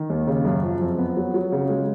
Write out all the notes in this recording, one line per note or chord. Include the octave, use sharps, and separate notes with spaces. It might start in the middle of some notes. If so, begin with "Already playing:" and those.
Already playing: D#3
D#2
C#3
F#2
F3
F2
B3
F#3
F#3
C#3
G#3